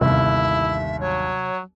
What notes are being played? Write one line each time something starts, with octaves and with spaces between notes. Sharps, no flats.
G1 D#2 C3 E4 E5
F#3 C#5